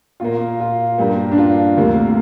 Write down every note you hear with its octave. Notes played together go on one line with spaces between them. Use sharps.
A#2 A#3 F4
F4
G2 G3 A#3
D4
F4
D2 C3 A#3